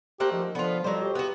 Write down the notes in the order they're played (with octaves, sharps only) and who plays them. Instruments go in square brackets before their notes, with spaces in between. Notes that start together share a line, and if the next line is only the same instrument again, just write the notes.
[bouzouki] A3 A#3 F#5 [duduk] G4 [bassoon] C5
[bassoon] D#3 [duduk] F3
[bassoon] D3 [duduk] F3 [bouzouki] B3 F4
[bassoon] F2 [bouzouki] F#3 C5 [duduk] G3
[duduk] G4
[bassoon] E2 [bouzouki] B3 F#4